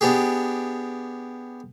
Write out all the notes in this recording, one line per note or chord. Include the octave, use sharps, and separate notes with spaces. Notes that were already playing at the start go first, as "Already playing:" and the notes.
B3 D4 G4 G#4